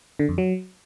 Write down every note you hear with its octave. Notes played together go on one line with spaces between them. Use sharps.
D3
F2
F#3